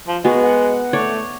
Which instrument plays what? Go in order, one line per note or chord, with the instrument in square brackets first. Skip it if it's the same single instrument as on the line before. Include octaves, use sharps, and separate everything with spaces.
[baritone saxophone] F3
[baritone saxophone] G#3 [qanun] B3 [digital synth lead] F#4
[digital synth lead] F#5
[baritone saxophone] A3 [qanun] C#5 D5